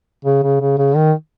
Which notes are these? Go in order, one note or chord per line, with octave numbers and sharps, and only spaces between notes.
C#3
C#3
C#3
C#3
D#3